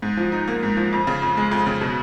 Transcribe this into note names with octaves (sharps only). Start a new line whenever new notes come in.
G#2
F3
D#4
A#3
G#2
F3
F2
C#3
F2
G#3
F2
C#3
B2